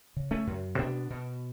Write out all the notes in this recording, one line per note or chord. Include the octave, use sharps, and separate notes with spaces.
C#3
A3 C#4
F#2
B2 B3 D4
B2